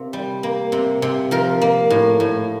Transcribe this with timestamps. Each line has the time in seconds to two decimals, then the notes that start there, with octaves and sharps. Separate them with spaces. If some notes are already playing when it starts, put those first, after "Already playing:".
Already playing: C3 A#3
0.13 G3
0.43 A#3
0.72 C3
1.02 C3
1.31 F3 A#4
1.62 A#3
1.90 A2
2.20 A2